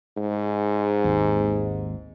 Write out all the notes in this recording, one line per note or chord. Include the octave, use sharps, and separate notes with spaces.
G#2
G#1 D#2